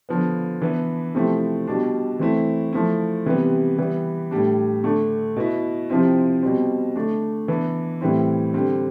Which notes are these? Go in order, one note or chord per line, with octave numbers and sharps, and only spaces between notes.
D3 F3 B3
E3 B3 D4
C3 F3 A3 C4 E4
B2 G3 D4
E3 A3 C4 E4
F3 A3 E4
C3 E3 G3 B3
E3 G3 B3
A2 G3 D4
D3 A3 D4
B2 B3 E4
C3 F3 C4 E4
B2 G3 C4
D3 A3 D4
E3 B3 D4
A2 E3 G3 C4 E4
D3 G3 C4